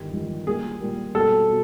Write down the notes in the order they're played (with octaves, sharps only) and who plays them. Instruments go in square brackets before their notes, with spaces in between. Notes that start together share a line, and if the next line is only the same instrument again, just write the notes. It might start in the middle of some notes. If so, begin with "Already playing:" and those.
Already playing: [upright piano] G1 G2 D#3 G3
G1 G2 D#3 G3
[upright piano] A#2 G3 A#3 [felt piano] G#4
[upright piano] A#2 G3 A#3
[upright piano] B2 G3 A#3 [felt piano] A4
[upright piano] B2